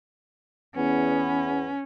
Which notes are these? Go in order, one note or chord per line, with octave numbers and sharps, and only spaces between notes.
E2 B3 C#4